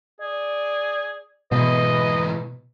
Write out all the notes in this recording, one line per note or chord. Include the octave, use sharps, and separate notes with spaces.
G#4 D5
G#2 B2 E3 B4 D#5